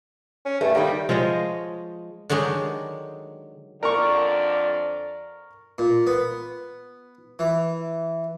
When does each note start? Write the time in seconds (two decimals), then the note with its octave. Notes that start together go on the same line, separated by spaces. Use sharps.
0.45 C#4
0.61 G2 A3
0.75 D#3 G3 A#3
1.09 F3 G#3 C#5 D#5
2.30 D3 D#3 F#3 G#3 G4
3.83 F2 D3 A#4 D5 A#5 C#6
5.78 A#2
6.07 B3
7.39 E3